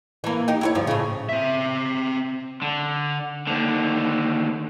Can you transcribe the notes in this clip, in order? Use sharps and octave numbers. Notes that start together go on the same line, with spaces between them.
E3 A#3
D#4 G4
E4 F#4 C#5
D2 G2 F3
A2 C#3
C4 E5
D3
D#2 D3